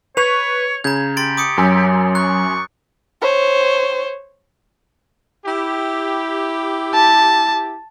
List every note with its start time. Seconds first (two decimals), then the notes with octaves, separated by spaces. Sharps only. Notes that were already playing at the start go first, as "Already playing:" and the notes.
0.17 B4 C#5 C#6 F7
0.84 C#3 A#5 G6 G#6
1.17 G4 C6 A6 D7
1.37 D6 D#6 C#7
1.58 F#2 F#3 G#5 E6
2.15 C#6 F#6
3.21 C5 C#5
5.46 E4 G4
6.94 A5